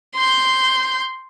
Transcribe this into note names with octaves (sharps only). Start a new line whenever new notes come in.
C6 G6